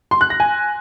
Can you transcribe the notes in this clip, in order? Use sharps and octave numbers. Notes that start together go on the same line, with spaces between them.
C6
F#6
A#6
G#5